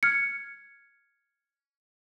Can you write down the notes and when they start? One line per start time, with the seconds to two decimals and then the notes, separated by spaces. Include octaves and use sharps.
0.03 F6 G#6 C#7